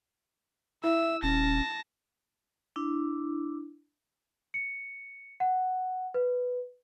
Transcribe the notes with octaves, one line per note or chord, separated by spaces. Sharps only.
E4 E5 E6
D#1 C#4 A5 A#6
D4 E4
C#7
F#5
B4